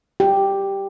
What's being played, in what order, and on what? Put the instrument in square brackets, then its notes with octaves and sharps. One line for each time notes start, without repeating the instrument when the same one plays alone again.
[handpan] G4